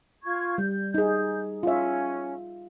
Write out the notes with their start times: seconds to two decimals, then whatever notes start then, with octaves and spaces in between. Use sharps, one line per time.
0.24 F4 C#6 G#6
0.58 G3 G6
0.94 D#4 G#4
1.63 C#4 F4 E5